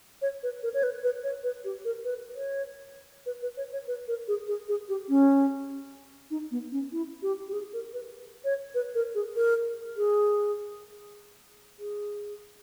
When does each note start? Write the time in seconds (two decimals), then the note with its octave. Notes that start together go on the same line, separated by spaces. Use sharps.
0.22 C#5
0.43 B4
0.63 A#4
0.74 C#5
0.83 B4
1.03 B4
1.24 C#5
1.44 B4
1.64 G4
1.85 A#4
2.05 B4
2.35 C#5
3.26 B4
3.42 B4
3.57 C#5
3.73 C#5
3.87 B4
4.08 A#4
4.28 G#4
4.48 G#4
4.69 G#4
4.89 G4
5.09 C#4
6.31 D#4
6.51 B3
6.72 C#4
6.92 E4
7.22 G4
7.49 G4
7.53 G#4
7.73 A#4
7.93 B4
8.44 C#5
8.75 B4
8.95 A#4
9.15 G#4
9.36 A#4
9.97 G#4
11.79 G#4